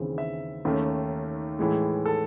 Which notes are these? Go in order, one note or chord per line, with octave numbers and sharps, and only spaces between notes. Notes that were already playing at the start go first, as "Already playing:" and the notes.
Already playing: D#2 C#3 E3 C4
E5
D#2 D#3 A3 C#4
A2 E3 G#3
A4